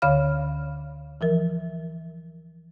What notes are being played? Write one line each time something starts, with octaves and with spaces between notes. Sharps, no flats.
D2 D3 C#5 F5 B5 F6
E3 F3 A#4